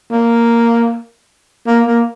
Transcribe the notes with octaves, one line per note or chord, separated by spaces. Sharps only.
A#3
A#3
A#3